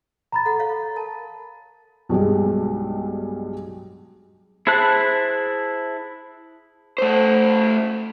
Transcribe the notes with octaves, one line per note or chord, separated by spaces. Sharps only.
A#5 B5 A6
A4 F#5
A4 C#5 F5
A#4 A5
B1 G2 G3 G#3
E4 G#4 C5 A5 F#6
A3 C5